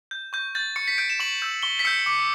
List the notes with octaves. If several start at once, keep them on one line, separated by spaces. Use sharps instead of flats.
G6
C#6 G6
G6 A6
C#6 C#7
B6
G6 D7
E7
C#6 F#7
E6 G6
C#6 G7
B6
E6 G6 C#7
D6 C#7